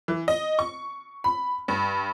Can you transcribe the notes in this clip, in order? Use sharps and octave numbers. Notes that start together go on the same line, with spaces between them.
E3
D#5
C#6
B5
G2